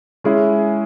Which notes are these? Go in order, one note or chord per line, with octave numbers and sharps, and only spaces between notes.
G#3 C#4 E4 G#4